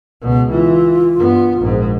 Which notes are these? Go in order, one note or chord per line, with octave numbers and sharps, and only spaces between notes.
C#2 B2
E3 F4
G2 B3
A#1 G#2